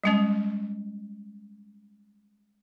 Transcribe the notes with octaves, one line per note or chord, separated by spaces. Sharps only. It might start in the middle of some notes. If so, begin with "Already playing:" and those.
G3 G#3 C#4